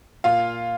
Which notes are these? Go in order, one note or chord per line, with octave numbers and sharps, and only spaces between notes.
A#2 F4 F5